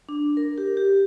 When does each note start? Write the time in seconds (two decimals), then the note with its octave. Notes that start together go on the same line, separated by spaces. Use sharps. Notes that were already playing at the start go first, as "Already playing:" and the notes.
0.09 D4
0.37 A#4
0.58 G4
0.77 G4